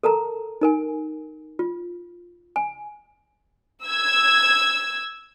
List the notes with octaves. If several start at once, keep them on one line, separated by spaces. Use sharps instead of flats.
A4 A#4 A5 A#5
D#4 A#4 G#5
F4
G#5
E6 G#6